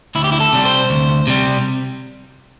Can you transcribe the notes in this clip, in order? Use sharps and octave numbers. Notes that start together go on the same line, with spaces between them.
D2 E4
G4
E4
A4
C3 G3
C5
D2
C3 G3